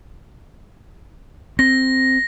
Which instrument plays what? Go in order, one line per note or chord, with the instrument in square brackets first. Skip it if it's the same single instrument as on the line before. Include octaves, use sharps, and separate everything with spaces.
[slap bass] C4 [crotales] A#6